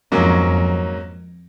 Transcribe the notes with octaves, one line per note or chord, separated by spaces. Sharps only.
F2 G#2 F#3 A#3 C#4